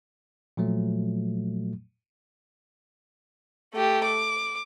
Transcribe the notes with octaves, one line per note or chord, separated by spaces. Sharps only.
A#2 F3 F#3 A3
A3 G4
D6